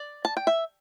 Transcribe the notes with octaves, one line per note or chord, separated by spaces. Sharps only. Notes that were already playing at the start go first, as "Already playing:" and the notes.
Already playing: D5
A5
G5
E5